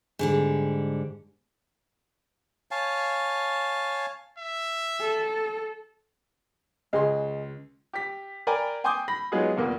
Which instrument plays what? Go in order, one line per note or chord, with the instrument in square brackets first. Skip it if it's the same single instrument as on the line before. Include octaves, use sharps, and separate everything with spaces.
[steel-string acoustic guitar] G#2 D3 G3
[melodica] C#5 F5 G#5 A5
[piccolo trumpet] E5
[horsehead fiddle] A4
[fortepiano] C#2 C6 [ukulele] G#4 D#5
[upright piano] G4 B6
A#4 D5 G5 G#5 A#5 B5
G5 G#5 C6 D6 D#6 G6
B5 A#6
F#3 G#3 B3 D#4 F4 G#4
F1 E2 A#2 A#3